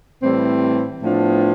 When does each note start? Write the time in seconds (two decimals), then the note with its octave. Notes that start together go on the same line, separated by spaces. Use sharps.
0.22 A2 E3 G3 C4
1.02 A2 F3 B3 D4 F4